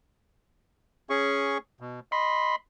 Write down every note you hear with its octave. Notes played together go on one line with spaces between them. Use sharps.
C#4 G#4 C#6
B2
D#5 B5 C6